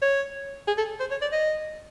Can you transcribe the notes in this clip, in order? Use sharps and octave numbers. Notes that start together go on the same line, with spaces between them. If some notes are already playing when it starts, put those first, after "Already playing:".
C#5
G#4
A4
C5
C#5
D5
D#5